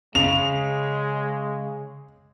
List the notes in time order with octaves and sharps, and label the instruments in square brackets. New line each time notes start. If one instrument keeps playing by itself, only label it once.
[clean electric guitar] C#3 [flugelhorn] G#3 [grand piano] F7